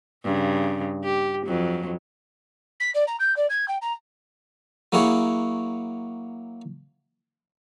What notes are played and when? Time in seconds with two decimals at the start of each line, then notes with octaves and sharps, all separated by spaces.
0.24 G2 C#3
1.04 G4
1.46 F2 F#3
2.80 B6
2.94 D5
3.07 A#5
3.20 G6
3.36 D5
3.50 G#6
3.68 G5
3.82 A#5
4.92 F#3 A#3 E4 F#4 G#4 C#5